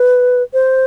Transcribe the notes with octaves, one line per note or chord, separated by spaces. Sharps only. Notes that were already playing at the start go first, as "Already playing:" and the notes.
Already playing: B4
C5